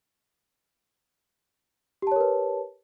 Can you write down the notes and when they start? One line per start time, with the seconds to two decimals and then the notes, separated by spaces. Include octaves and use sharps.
2.02 G4
2.07 A5
2.12 C#5
2.16 A#4
2.21 B4